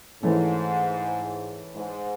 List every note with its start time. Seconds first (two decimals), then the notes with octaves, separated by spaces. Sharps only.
0.23 G#2 E3 A3 C#4
1.75 G#2